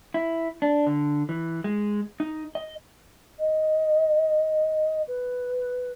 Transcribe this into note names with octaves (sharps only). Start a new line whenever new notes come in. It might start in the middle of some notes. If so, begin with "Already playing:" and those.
E4
D4
D3
E3
G#3
D#4
D#5
D#5
B4